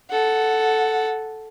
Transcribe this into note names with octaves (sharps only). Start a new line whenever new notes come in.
A4 F#5